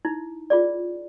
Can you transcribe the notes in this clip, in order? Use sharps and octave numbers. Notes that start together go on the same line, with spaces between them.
D#4 E4
F4 G#4 D5